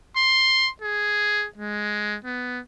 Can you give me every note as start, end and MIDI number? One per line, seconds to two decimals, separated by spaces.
0.17 0.70 84
0.82 1.46 68
1.57 2.16 56
2.25 2.60 59